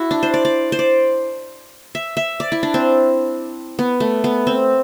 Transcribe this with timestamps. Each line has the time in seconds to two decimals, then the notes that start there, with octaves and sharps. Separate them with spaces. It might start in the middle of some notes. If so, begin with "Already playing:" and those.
Already playing: E4 F#4
0.11 D4
0.23 C5
0.34 D5
0.45 D5
0.72 C5
0.79 D5
1.95 E5
2.17 E5
2.40 D5
2.52 E4
2.63 D4
2.74 C4
3.79 B3
4.00 A3
4.24 B3
4.47 C4